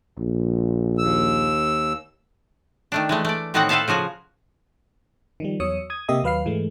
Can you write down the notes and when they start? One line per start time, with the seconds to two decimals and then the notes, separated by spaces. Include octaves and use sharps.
0.18 A#1
0.98 D#2 E6
2.92 D#3 A3 D4
3.09 E3 G#3 A3
3.25 A3 D5
3.54 A2 D#3 B3 C4 F#4 F#5
3.69 A4 B4 C5 E5 F5 A5
3.88 C#3 F3 F#4 G#5
5.40 D#3 F3 G3
5.60 E2 F#3 C#5 D#6 E6 C#7
5.90 D#6 G#6
6.08 C3 A#3 G4 D#5 E5 D#6
6.23 D#2 F#3 B4 F5 F6 C7
6.45 G#2 E3 G#3 A3